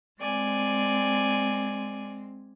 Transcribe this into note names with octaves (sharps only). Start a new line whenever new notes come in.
G#3 C4 D5 G#5